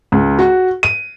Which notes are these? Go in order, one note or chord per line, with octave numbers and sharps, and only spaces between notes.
C#2
F#4
D#7